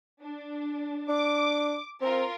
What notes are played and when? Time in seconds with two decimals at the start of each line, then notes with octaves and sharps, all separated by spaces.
0.20 D4
1.09 D4 D6
2.01 C4 F4 A#4